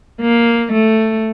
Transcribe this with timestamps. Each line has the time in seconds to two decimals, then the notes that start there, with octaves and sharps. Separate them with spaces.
0.21 A#3
0.72 A3